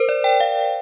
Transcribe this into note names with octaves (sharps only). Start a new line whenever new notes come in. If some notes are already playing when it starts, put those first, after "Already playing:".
Already playing: A#4 C5
D5
G5
F5